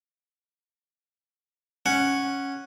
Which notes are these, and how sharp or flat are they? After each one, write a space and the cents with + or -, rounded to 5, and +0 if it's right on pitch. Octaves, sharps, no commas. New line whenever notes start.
C#4 +0 F#5 +0